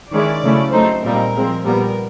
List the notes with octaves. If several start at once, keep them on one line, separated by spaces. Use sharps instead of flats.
D#3 G#3 C#4 E4 D5
C#3 F#3 A3 C#4 E4
F#3 A3 C4 D#4 C5
A#2 G3 C4 D#4 A#4
F3 G#3 C4
A#2 G3 B3 A#4